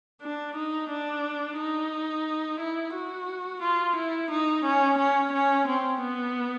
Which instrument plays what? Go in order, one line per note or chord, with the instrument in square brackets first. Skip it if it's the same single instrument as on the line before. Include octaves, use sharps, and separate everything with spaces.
[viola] D4
D#4
D4
D#4
E4
F#4
F4
E4
D#4
C#4
C#4
C#4
C4
B3